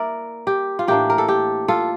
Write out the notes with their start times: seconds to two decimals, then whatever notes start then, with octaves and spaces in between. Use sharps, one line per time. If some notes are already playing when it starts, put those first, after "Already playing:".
Already playing: A#3 E4 A#4 D5 E5
0.47 G4
0.79 F4
0.88 A2 E3 A#3 D4 G4
1.10 A#4
1.18 A4
1.28 G4
1.68 F4 A4